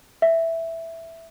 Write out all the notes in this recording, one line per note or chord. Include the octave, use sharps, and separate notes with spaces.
E5